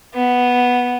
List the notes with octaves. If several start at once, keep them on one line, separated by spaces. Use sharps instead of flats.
B3